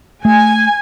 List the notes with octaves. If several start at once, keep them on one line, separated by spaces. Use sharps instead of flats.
A3 G#5